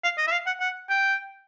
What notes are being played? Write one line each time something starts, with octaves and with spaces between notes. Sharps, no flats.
F5
D#5
E5
F5
F#5
F#5
G5